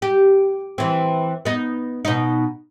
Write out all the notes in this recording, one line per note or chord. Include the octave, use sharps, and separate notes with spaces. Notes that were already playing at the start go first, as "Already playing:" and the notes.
G4
E3 C4
B3 D#4
B2 D#4